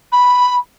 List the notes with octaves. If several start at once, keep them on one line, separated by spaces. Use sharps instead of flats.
B5